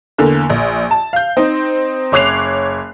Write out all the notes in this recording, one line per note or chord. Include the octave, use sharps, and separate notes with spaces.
E2 D3 A#3
A#1
A5
F5 G6
C4 D#4
F#1 C#5 D6 F#6 C7 F7